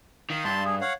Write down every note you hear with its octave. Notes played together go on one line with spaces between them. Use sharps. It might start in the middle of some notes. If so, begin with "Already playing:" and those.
D#3 F5 D#6
G2 A5 C6
G#4
C#5 F5 F#5